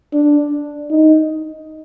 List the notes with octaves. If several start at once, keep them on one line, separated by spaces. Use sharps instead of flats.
D4
D#4